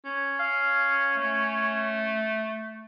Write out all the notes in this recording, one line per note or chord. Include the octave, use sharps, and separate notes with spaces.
C#4
F5
A3